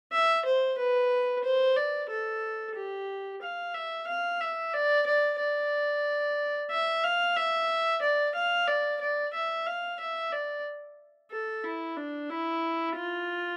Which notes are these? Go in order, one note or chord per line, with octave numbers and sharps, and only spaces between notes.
E5
C5
B4
C5
D5
A4
G4
F5
E5
F5
E5
D5
D5
D5
E5
F5
E5
D5
F5
D5
D5
E5
F5
E5
D5
A4
E4
D4
E4
F4